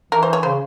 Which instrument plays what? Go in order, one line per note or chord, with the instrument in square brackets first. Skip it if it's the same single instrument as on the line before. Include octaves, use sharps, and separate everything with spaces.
[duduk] E3 [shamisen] A#4
[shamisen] C5
C#5
[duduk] C#3 [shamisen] C5